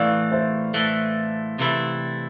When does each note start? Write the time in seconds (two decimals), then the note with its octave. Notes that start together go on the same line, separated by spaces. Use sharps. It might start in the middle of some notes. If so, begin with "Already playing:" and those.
Already playing: A2 E3 A3 D5 F5
0.32 C5 E5
0.74 A2 E3 A3
1.59 C3 E3 A3 E4